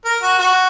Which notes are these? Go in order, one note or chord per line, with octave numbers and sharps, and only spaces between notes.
A#4
F#4
F#4